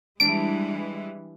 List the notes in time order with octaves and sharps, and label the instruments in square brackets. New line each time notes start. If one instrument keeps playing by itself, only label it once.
[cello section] E3 G3 G#3 [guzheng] D4 [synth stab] D7